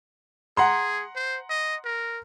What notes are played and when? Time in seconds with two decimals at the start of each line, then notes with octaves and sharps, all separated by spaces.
0.57 G#4 F#5 A#5 C6
1.16 C5
1.49 D#5
1.85 A#4